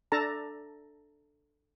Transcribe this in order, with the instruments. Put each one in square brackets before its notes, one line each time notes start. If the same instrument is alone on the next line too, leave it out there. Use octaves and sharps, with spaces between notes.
[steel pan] D4 A4 A5 A#5